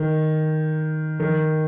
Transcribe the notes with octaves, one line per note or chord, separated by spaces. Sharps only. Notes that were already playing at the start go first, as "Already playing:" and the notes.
Already playing: D#3
D#3